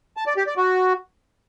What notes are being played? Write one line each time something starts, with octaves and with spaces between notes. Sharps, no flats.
A5
D5
G4
D5
F#4